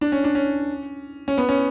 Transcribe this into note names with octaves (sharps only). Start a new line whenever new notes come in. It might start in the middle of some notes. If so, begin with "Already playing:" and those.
D4
C#4
D4
C#4
C#4
B3
C#4